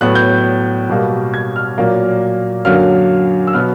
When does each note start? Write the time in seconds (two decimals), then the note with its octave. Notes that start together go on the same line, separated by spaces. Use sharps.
0.01 A2 F#3 B3 F#6
0.15 G6
0.89 B2 G3 A#3
1.34 G#6
1.56 F6
1.78 A#2 F#3 A#3
2.65 F#2 D3 F#3 A#3 F6
3.47 E6
3.53 B2 F#3 B3 F6